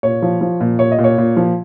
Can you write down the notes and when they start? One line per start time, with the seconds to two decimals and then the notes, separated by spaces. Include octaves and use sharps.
0.03 A#2 C#5
0.22 F3
0.41 F3
0.61 A#2
0.79 A#2 C#5
0.92 D#5
0.99 A#2
1.04 C#5
1.18 A#2
1.37 F3